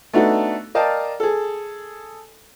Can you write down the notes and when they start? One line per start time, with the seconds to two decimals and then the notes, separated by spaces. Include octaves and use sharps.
0.13 A3 B3 D4 D#4 F#4 A4
0.75 A#4 D5 D#5 F5 G5 A5
1.20 G#4 A4